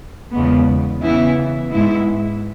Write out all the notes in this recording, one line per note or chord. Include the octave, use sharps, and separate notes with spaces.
E2 C#3 G#3 B3
C#3 E3 B3 E4
G#2 G#3 B3 E4